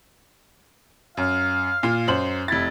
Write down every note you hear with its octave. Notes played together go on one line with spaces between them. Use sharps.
F#2 F5
A#2 F4 C7
F#2 C5 F#7
F1 E4 A6